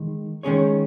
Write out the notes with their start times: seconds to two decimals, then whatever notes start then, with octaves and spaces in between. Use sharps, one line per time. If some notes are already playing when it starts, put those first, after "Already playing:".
Already playing: D#3 G#3
0.43 D#3 G#3 C#4 G#4 C#5